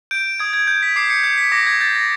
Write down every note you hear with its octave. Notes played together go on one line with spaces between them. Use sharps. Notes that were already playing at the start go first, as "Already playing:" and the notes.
G6 D7
D#6 G#6
G#6
G6
B6
D6 C7
C#7
G6 C7
B6
D6 A#6
G#6
G6 A6
A#6